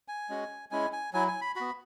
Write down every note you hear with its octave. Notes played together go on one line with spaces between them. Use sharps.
G#5
G#3 C#4 F#4
G#3 C#4 E4 G#5
G#5
F#3 E4 G#5
G#5
B5
B3 F#4 B5